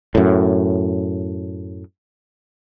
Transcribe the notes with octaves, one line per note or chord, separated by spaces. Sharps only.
F#2 A2